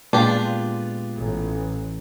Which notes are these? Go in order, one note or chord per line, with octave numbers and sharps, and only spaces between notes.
A#2 G#3 B3 D4 F4 G4
A1